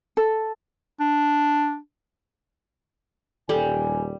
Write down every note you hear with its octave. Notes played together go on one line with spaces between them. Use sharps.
A4
D4
D#1 G3 A4 G#5